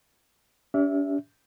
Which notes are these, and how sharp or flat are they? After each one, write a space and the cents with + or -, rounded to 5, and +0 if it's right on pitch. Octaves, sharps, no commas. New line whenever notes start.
D4 -45 G4 +0 E5 +0